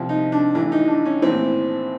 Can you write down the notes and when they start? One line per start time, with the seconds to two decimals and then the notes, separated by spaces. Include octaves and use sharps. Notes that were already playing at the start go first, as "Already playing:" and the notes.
Already playing: C2 C3 F3
0.09 D#4
0.32 D4
0.54 A1 A2 E3 D4
0.72 D#4
0.88 D4
1.05 C#4
1.22 A#1 A2 E3 C4